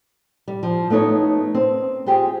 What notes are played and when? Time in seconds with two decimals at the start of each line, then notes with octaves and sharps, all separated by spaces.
0.48 G3
0.63 F3
0.90 A3 B3 D#4 C#5
1.54 C4
2.06 C4 F4 G4 G#4